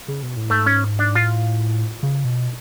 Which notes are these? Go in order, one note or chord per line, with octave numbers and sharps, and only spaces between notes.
C#3
B2
A2
G#2 A3
C#4
D4
A2 F4
C#3
B2